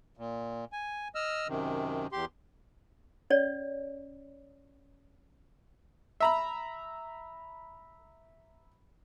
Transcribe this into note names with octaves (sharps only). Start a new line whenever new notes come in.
A#2
G#5
D#5 E6 F6
F#2 C3 D#3
E2 G4 C6
C#4 C#5 D5
E5 A#5 B5